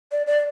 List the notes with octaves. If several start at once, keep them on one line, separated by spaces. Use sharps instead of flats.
D5
D5